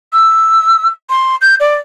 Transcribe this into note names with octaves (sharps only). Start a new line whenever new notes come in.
E6
C6
G6
D5